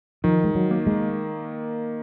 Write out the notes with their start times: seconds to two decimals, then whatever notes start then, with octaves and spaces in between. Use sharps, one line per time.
0.24 D#3 F3
0.44 G#3
0.55 F#3
0.71 A#3
0.87 G#3